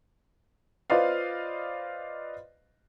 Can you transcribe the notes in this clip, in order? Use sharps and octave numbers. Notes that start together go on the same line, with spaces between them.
F4 B4 C5 D5 D#5 F5